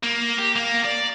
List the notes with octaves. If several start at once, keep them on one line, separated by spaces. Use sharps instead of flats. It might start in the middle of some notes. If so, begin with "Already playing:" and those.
A#3
G4
A#3
D5